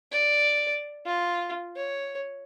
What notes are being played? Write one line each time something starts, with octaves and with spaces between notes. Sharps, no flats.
D5
F4
C#5